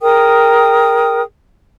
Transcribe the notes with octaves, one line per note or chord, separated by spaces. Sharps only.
G#4 A#4 G5 D#6